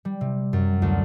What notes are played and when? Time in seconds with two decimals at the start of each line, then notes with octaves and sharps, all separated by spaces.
0.05 G3
0.21 C3
0.53 F#2
0.82 D2